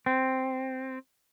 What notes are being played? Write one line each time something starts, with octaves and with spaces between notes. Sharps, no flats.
C4